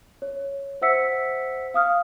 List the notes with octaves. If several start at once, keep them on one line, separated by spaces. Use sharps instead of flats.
C#5
C5 E5 F#5 E6 B6 C#7
F5 D#6 F6